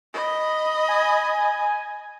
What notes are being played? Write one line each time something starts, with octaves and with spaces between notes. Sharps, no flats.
D#5 B5
G#5